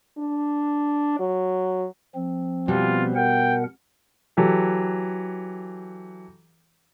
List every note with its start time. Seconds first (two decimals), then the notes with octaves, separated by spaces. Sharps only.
0.18 D4
1.19 F#3
2.15 F3 C4
2.68 B2 G3 F4
3.16 A#4 F#5 G5
4.37 E3 F#3 G4 A4